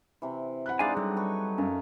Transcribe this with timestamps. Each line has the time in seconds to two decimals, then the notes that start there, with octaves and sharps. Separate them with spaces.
0.22 C3 E3
0.66 F#5 B5 F#6
0.79 G#3 D4 D#4 D5 F5 G#5
0.97 F#3 G3 A4
1.17 B4 C#6
1.58 F#2 F5